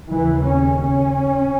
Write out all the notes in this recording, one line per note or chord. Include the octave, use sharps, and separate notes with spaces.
D#2 C#3 E3
C#4
C#4